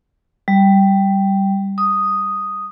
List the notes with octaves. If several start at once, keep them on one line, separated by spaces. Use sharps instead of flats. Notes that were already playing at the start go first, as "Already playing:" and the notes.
G3
D#6